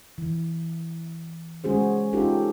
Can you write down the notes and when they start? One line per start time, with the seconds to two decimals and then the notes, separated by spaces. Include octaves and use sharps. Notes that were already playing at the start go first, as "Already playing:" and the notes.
0.18 E3
1.64 G#3 C#4 F#4 G#4 C5
2.13 C#4 D#4 F4 G4 A4